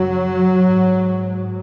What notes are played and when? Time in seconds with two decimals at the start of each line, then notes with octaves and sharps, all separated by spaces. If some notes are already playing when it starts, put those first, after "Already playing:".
Already playing: F#2 C#3 F#3
0.60 G#2